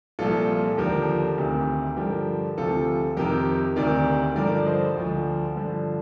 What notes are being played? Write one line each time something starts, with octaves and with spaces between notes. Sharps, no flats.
C2 A#2 F3 F4 A4
A4
D#2 D3 F3 G4 A#4
D2 C3 D#3
G2 D3 F3 G4 A#4
D2 C3 F3 F4 A4
F2 C3 D#3 G4 A#4
D2 C3 D#3 A#4 D5
G2 D3 F3 A#4 D5
C5 D#5
D2 D3 F3
G2 D3 F3